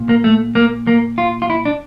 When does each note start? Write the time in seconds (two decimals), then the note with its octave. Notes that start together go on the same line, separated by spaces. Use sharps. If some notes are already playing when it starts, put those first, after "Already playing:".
Already playing: A#2
0.09 A#3
0.24 A3
0.55 A#3
0.87 A#3
1.18 F4
1.42 F4
1.50 E4
1.65 D4